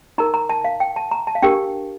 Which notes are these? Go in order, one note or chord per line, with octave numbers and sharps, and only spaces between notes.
D#4 A#4 A#5
A#5
A5
F5
G5
A5
A#5
A5
F5
D4 G4 A#4 G5